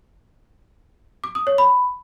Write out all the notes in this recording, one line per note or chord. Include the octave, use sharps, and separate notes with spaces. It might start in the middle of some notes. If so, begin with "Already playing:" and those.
D6
D#6
C#5
B5